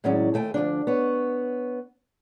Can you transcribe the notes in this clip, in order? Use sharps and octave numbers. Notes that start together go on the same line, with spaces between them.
A2 D#3 F#3 G#3 C#4 D5
D#2 A3 G5 G#5
D2 G2 F3 D4
B3 C#5